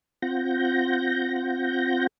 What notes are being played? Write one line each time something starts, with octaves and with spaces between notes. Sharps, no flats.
C4 F4 F#5 G6 A#6